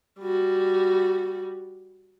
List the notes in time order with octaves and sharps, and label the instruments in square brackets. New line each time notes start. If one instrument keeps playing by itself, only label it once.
[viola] G3 F#4